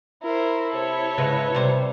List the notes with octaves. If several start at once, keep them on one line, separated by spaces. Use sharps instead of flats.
E4 A#4 C5
C3 A4 C#5
G#2 C#3 G#3 B4
C3 G3 C5